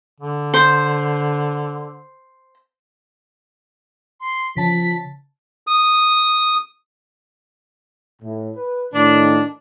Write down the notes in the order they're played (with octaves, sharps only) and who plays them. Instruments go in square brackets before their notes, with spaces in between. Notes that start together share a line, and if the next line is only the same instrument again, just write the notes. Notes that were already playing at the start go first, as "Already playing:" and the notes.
[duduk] D3
[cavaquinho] C5
[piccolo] C6
[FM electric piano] C#3 A5 [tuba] F3 [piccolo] B6
[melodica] D#6
[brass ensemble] A2
B4
[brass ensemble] A2 D#3 [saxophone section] D4